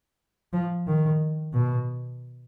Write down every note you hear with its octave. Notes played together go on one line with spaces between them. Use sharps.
F3
D#3
B2